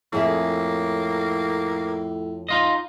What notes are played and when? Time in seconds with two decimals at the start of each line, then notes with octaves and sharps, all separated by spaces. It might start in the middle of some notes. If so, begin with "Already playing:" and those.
0.13 F2 A2 A#3 G#4 E5
2.49 D#4 F4 D#5